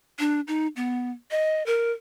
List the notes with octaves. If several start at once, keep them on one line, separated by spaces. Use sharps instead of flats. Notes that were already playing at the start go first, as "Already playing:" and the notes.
D4
D#4
B3
D#5
A#4